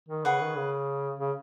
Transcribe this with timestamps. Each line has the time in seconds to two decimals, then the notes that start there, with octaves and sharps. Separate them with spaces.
0.09 D#3
0.25 C#3 G#4 B4 F#5 C#6
0.41 D#3
0.56 C#3
1.19 C#3